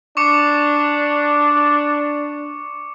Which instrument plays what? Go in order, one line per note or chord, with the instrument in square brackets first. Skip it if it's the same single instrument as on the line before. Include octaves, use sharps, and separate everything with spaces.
[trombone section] D4 [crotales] C#6 D6 C#7